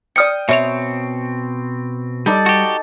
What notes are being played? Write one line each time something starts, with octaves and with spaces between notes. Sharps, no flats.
D5 G5 D#6 F6 C#7
B2 C4 C#5 E5 F7
G3 D#4 A4 D5
F#4 G4